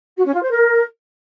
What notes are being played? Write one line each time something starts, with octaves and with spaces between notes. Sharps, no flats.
F#4
C#4
F4
C5
A#4